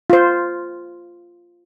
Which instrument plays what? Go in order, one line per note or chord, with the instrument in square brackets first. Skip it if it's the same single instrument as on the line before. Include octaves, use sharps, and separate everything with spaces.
[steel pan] F4 C5